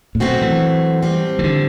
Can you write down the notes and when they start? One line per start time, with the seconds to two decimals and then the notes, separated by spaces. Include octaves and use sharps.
0.15 A2
0.20 B2 F#3 A3 C4 F#4
0.42 E3
1.02 A2 G3 C4
1.39 E3
1.44 D3